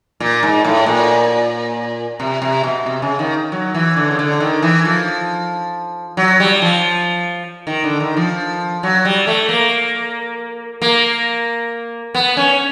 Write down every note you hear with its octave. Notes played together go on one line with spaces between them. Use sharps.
A#2
G#2
A2
A#2
C3
C3
B2
C3
C#3
D#3
F#3
E3
D3
C#3
D3
D#3
E3
F3
F#3
G3
F3
D#3
D3
D#3
F3
F#3
G3
A3
A#3
A#3
B3
C#4